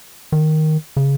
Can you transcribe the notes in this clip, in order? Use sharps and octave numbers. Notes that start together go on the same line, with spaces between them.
D#3
C#3